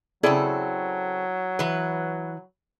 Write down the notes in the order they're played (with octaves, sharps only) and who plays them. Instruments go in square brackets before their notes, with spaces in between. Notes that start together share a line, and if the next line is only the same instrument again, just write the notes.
[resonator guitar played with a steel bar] C#3 C4 A4 [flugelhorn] F#3 [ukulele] E4 G#4 D5
[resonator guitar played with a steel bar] E3 B4